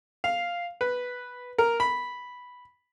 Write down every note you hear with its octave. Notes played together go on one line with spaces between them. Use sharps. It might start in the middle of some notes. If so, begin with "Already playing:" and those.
F5
B4
A#4
B5